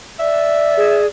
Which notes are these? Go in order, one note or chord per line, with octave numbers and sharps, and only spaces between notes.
D5 E5
G#4